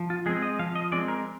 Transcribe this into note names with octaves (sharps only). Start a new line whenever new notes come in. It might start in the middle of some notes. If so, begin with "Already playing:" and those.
Already playing: F3
F4
G#3 C4 G#4
D#5
F3 F5
D#5
G#3 C4 D5
A#4